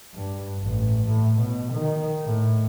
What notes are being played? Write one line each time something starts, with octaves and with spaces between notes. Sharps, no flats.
G2
A1
A2
B2
D#3
A2